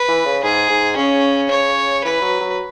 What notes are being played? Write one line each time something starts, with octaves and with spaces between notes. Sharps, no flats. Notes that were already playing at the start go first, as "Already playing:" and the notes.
Already playing: B4
E3
C#3
G#2 G#4
G#2
C#3 C#4
C#5
E3 B4
F#3
F#3